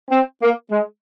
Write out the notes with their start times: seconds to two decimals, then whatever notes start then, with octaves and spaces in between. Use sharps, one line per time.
0.10 C4
0.40 A#3
0.71 G#3